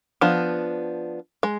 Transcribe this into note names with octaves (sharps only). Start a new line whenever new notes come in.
F3 B3 D4
G#3